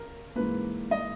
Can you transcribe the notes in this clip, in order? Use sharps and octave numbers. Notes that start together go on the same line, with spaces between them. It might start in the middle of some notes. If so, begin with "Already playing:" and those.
Already playing: C#3 A#4
G#2 E3 A#3 B4
D#5